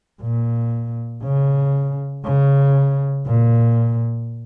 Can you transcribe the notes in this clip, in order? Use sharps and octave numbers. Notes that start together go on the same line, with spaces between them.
A#2
C#3
C#3
A#2